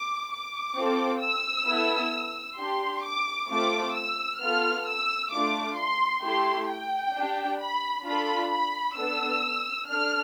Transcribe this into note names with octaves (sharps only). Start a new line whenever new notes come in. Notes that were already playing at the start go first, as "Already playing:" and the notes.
Already playing: D6
D6
C4 F4 A4
E6
B3 E4 A4
D4 G4 C6
D6
A3 C4 F4 A4 D6
E6
B3 F4 A4 F6
E6
A3 D4 F4 D6
C6
A3 E4 G4 C6
G5
D4 G4
B5
D4 F4 A4 B5
B5
B3 D4 A4 E6
D4 A4 F6